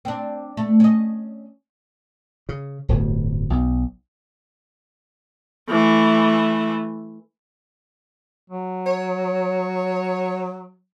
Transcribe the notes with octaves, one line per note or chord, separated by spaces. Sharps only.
C4 D4
A3
C#4 D#5
C#3
D1 G1 D2
B1
E3 A3
F#3
C#5